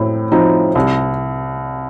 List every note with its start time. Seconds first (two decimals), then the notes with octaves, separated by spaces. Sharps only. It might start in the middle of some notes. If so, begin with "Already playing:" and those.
Already playing: A2 C4
0.32 F3 C4 D#4
0.75 C2